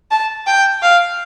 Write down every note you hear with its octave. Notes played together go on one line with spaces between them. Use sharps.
A5
G5
F5